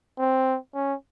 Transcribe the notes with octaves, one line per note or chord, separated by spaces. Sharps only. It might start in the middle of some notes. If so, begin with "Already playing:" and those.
C4
C#4